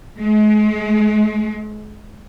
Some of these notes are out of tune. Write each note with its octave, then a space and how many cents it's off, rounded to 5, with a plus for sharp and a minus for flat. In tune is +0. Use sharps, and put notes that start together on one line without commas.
G#3 +40